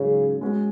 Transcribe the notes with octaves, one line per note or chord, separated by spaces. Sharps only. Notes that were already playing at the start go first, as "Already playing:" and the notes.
Already playing: G#2 C#3 F#3 C#4
G#3 C#4 F#4